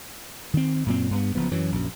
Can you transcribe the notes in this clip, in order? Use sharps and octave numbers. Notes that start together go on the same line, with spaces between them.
D#3 C4
F#2 A#2 C4
G2 A#3 B3
F#1 F3 B3
F#2 E3 F#3
A#1 F#2